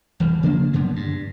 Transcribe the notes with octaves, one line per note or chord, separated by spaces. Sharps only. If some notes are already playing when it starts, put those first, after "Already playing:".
E1 E3 G3
C#3 F3 A#3 D4
F#2 D3 B3
G2